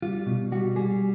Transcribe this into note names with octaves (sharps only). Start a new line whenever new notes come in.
G3 F4
B2
G3 F#4
G3 G#4